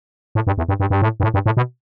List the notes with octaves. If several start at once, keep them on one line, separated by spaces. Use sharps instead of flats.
A2
G2
E2
G2
G2
G2
A2
G2
A2
G2
A2
B2